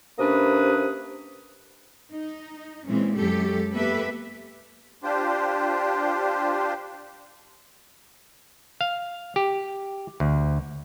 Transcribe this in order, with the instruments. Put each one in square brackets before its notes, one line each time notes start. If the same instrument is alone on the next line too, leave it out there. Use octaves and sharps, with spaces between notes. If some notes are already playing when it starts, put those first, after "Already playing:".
[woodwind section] C3 A#3 C#4 D4 B4 D#6
[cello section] D#4
A#2 E3 G#3 C4 C#4
F#2 F#3 G#3 G4 A4
A#3 B3 G4 A4 B4 E5
[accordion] D4 F4 G4 C5
[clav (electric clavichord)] F5
G4
D2